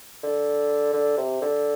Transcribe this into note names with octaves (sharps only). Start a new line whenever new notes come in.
D3
D3
C3
D3